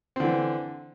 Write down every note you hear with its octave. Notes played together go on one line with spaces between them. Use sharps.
D3 E3 C4